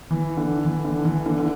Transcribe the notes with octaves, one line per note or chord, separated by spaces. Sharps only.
E3
D3
E3
D3
E3
D3
D3